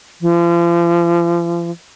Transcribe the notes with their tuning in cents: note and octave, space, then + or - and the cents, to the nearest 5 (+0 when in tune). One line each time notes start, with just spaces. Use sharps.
F3 -40